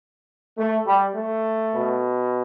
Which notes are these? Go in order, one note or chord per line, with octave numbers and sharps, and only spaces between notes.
A3
G3
A3
B2